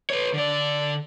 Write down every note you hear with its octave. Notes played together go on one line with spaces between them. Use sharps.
B4 C#5
D3 D5